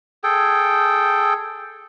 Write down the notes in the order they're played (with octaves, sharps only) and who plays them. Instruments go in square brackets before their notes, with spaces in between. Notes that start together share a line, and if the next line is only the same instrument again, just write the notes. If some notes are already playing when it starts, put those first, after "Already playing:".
[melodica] G#4 A4 G5